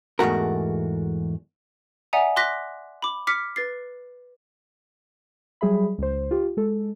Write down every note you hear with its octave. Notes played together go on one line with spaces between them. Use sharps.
E2 G#2 A3 F#4 A#4
D5 E5 F#5 G#5 A#5 D#6
C6 D6 F#6 A#6 B6
B5 D6
D6 F6 B6 C#7
B4 A6 C7
F#3 G3 G#4 E5 B5
C#2 C5
F4 G4
G#3 A4